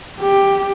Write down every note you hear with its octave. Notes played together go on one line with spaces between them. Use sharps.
G4